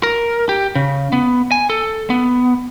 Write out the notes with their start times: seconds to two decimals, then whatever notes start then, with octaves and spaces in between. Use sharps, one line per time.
0.03 A#4
0.49 G4
0.75 C#3
1.13 B3
1.52 G#5
1.70 A4
2.10 B3